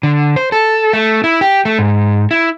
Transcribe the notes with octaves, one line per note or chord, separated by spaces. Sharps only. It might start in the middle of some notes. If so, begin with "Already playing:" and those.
D3
C5
A4
A3
E4
G4
A3
G#2
E4